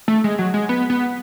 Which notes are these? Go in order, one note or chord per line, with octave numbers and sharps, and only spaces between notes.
A3
G#3
F#3
G#3
B3
B3